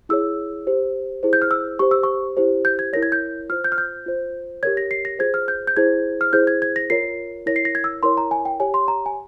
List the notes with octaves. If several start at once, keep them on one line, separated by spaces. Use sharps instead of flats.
E4 G#4 C#5 E6
G4 C5
E4 G#4 C5
G6
F6
E6
G4 C5 C#6
E6
C#6
E4 G4 C5
G6
G#6
E4 A#4 C#5 A#6
G#6
G6
F4 C5 F6
G6
F6
G6
F4 C5
G4 A#4 C#5 G#6
A#6
C7
A#6
F4 G#4 C5 G#6
F6
G6
G6
E4 G#4 C5 G#6
F6
E4 G#4 C5 G6
G#6
G#6
A#6
F4 A#4 C#5 C7
E4 A#4 C#5 A#6
C7
A#6
G#6
E6
E4 A#4 C#5 C6
A#5
G#5
G5
G4 C#5 G#5
C6
A#5
G#5